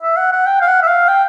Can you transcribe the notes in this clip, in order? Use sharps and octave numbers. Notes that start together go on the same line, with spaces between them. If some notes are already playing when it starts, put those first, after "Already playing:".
E5
F#5
F#5
G5
F5
F#5
E5
F5
G5